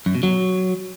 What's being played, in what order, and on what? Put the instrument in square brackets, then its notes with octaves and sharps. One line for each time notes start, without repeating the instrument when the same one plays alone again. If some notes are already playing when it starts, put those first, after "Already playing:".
[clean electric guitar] F#2
B2
F#3